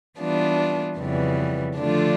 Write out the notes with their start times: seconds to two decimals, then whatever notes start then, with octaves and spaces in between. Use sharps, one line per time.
0.18 E3 G3 B3 D4 F4
0.97 F2 C#3 E3 G3 B3
1.76 D3 F3 A3 D4 F4